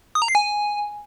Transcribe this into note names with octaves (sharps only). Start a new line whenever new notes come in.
D#6
A#5
C7
G#5